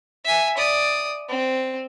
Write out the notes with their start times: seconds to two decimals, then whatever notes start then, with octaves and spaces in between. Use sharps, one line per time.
0.25 E5 G#5
0.57 D5 D#6
1.29 C4